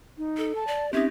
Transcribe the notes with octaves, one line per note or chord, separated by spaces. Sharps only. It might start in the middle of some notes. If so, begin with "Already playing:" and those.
D#4
A4
A5
D5
C4 C#4 D#4 G4 E5